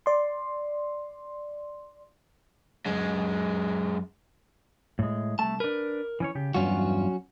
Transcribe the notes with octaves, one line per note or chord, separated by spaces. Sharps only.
D5 C6
F#2 G#3
A2 G#3
C2 A3 A5
D4 A#4 B4
E3 C#4 C#5
C#3 G4
E2 G2 F#3 C#4 F4 F#4